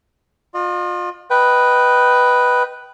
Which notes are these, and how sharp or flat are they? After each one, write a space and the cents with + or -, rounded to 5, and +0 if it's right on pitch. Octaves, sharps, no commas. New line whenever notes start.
F4 +30 D#5 -40
B4 +0 D#5 +0 G5 -15